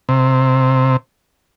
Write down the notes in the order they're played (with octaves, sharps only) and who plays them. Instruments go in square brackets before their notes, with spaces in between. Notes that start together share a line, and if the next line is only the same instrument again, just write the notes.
[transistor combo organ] C3